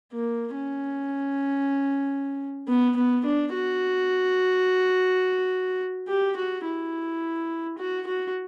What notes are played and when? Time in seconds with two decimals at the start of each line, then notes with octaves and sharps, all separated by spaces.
0.13 A#3
0.56 C#4
2.68 B3
2.97 B3
3.25 D4
3.53 F#4
6.08 G4
6.36 F#4
6.65 E4
7.78 F#4
8.07 F#4